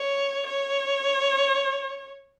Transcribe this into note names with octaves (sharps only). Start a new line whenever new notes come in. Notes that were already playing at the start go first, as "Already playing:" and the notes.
Already playing: C#5
C#5